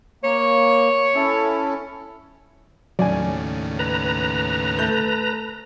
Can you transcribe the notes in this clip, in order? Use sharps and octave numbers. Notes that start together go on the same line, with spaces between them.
A#3 C#5
C#4 E4 A4
D#2 A2 C#3 F#3 D5 G#5
B4 A#5
A3 G6